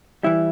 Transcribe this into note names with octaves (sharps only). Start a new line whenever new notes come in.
E3 G3 E4